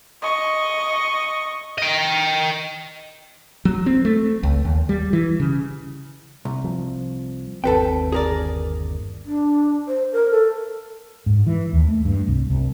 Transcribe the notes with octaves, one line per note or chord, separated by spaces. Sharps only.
D#5 C#6
D#5 G5
F#3
C4
A3
C#2
D#2
G3
E3
C#3
C2
F3
G1 D#2 C4 A4 B4 G5
G#4 A#4 D5
D4
C5
A#4
A4
G#2
E3
D#2
A3
G2
C2
C2